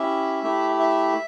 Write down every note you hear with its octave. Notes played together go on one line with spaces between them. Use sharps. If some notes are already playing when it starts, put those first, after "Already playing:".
Already playing: C#4 E4 G4 E5
A3 E4 G4
E5